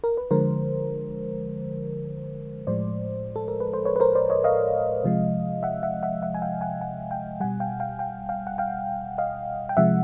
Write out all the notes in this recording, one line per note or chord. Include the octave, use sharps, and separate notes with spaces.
A#4
B4
D3 F3 G#3 A#4 C5
A2 F3 G#3 C5 D5
A4
A#4
B4
C5
B4 C#5
B4
A#4 C5
C5 D5
C#5 D#5
D#5 F5
C3 F3 G#3
E5 F#5
E5 F#5
E5 F#5
E5 F#5
G#5
F5 G5
F#5 G#5
F#5 G#5
F5 G5
B2 G3 F#5 G#5
F5 G5
F5 G5
F5 G5
F5 G5
F#5
F5 G5
D#5 F5
G5
C3 F3 G#3 E5 F#5